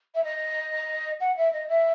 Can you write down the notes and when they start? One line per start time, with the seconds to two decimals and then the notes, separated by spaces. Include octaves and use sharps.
0.14 E5
0.23 D#5
1.20 F#5
1.36 E5
1.52 D#5
1.68 E5